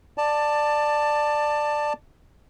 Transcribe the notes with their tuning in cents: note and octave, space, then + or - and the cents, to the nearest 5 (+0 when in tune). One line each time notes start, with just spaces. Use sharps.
D5 +15 A5 +10